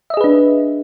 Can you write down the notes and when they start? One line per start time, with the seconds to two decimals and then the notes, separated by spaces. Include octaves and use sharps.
0.10 E5
0.14 D#5
0.17 G#4
0.21 B4
0.24 D4